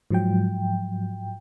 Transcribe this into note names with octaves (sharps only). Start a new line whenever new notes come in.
G#2 F3 F#3 G5